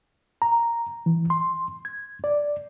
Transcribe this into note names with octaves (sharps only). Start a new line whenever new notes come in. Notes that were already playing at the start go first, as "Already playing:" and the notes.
A#5
E3
C6
G#6
D5